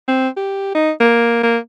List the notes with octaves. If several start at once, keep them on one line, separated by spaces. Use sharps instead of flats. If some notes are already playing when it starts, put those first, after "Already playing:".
C4
G4
D#4
A#3
A#3